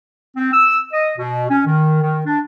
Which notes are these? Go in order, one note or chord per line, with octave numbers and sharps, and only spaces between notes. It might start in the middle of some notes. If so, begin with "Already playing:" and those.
C4
E6
D#5
B2
C#4
D#3
D#3
D4